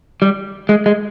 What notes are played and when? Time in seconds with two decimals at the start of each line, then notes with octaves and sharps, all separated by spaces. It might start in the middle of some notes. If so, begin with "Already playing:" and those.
0.22 G3
0.69 G#3
0.86 G#3